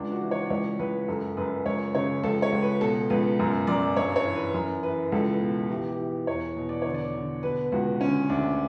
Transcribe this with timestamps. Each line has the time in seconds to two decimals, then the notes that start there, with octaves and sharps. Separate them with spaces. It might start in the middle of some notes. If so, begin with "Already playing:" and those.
Already playing: C#2 D4
0.12 F#4
0.21 E3
0.31 C#5
0.46 D5
0.50 C#2 C#5
0.79 C#2 B4
1.08 F#2 A4
1.37 F#2 B4
1.66 C#2 C#5
1.95 C#3 C#5
2.23 C#2 A4
2.42 C#5
2.52 C#2
2.62 B4
2.81 B2 A4
3.10 C#2 B4
3.39 F#2
3.67 F#2 D5
3.97 G2 C#5
4.16 C#5
4.25 E3
4.35 B4
4.54 F#2
4.83 E3 B4
5.12 C#2 A4
5.31 B4
5.41 B2
5.70 E3 G4
5.89 G4
5.99 E3
6.27 E2 C#5
6.57 B2
6.69 D5
6.82 D3 C#5
6.94 D5
7.14 D3
7.43 B2 B4
7.72 C#2 F#4
8.00 D3 C#4
8.29 D2 D4